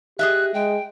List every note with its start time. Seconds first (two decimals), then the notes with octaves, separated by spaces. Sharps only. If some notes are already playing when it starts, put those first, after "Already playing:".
0.19 G4 G#4 D#5 E5 F#6
0.54 G#3 G5